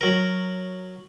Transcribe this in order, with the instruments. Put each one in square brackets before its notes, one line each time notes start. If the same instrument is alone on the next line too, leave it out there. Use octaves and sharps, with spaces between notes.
[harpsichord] F#3 A#4